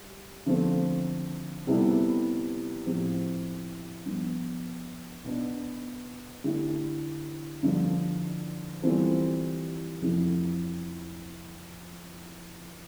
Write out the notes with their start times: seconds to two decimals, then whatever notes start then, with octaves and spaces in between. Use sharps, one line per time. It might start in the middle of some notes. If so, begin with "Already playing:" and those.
Already playing: G3
0.46 D3 F3 A3 C4
1.67 C3 G3 B3 E4 A4
2.86 A2 F3 C4 G4
4.06 G2 F3 B3
5.24 B2 B3 D4
6.44 D3 A3 E4 G4
7.63 G2 D3 F3
8.82 E3 G3 C4 F4 A4
10.02 F2 C3 F3 A3 E4